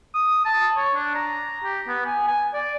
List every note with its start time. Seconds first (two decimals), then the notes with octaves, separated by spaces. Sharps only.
0.15 D#6
0.46 A5
0.77 C#5
0.95 D4
1.15 A#5
1.64 G4
1.87 B3
2.06 G#5
2.28 G#5
2.54 D5